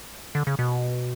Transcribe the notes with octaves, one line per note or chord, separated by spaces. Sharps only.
D3
C#3
B2